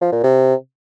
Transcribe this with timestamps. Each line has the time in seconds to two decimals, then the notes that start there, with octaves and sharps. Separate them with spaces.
0.01 F3
0.12 A#2
0.23 C3